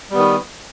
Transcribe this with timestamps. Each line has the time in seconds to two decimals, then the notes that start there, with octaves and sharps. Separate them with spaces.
0.11 G3
0.14 B3
0.17 D#3